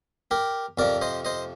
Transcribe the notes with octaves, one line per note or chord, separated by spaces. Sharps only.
G4 A#4
F2 C3 F3 A#4 D5
C5 D#5
C5 D#5